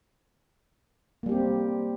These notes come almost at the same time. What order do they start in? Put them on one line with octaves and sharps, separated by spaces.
A#3 G3 G4 C4